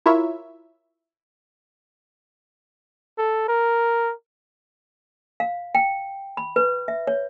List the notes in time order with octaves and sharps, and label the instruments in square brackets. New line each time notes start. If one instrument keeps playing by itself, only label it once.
[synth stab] E4 F4 A#4 C#5 E5
[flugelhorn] A4
A#4
[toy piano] F5
G5
B5
B4
E5
C#5